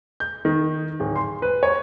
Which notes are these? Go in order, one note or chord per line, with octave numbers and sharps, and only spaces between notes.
G6
D#3
D1
C6
B4
C#5